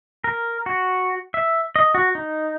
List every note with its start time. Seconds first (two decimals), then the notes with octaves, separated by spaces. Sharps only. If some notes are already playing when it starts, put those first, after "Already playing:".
0.24 A#4
0.66 F#4
1.34 E5
1.76 D#5
1.95 F#4
2.15 D#4